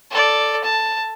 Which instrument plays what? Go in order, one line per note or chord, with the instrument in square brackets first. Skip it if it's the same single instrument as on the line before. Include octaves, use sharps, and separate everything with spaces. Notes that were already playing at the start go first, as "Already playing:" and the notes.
[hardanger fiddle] A4 D5
A5